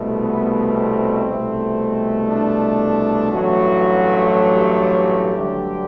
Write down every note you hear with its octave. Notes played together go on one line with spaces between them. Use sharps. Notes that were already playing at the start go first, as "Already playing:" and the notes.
Already playing: C2 B2 A3
B3
C4
C2 B2 A3
D4
A1 G2 F#3 A3 F#4
G4
G2 D3 F#3 A3